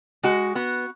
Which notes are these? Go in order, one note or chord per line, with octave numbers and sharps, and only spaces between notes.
G#3 F#4
B3 F#4